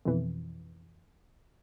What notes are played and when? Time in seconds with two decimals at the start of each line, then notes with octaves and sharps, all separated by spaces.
0.05 F2 B2 E3